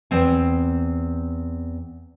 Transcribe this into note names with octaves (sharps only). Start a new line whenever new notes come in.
E2 C4 G#5